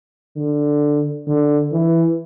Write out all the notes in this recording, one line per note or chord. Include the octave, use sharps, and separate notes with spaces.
D3
D3
E3